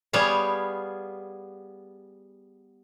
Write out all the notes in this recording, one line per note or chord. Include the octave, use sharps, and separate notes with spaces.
G3 B3 G#4 C#5 F5